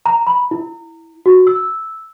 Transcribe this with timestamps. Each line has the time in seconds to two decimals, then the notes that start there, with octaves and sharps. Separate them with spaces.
0.06 A#5
0.27 B5
0.51 E4
1.26 F#4
1.47 E6